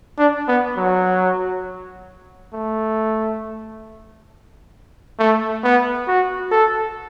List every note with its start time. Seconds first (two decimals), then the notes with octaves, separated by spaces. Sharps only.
0.18 D4
0.48 B3
0.77 F#3
2.54 A3
5.19 A3
5.64 B3
6.08 F#4
6.51 A4